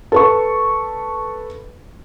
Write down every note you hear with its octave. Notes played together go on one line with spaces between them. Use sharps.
A4 B4 C#6